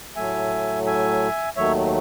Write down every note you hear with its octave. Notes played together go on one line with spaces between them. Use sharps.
A2 F#3 A3 E5 G#5
E5 G#5
D#2 D#3 F#3 A3 C#5 E5